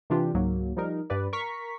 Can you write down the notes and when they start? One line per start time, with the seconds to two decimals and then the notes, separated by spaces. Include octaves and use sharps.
0.10 C3 E3 D4 F4 G4
0.34 C#2 G#2 F#3 A#3
0.76 F3 G3 D#4 A#4
1.10 G2 G3 B4 D5
1.33 A#4 A#5 C#6 B6